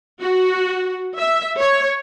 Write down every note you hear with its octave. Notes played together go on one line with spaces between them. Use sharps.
F#4
E5
C#5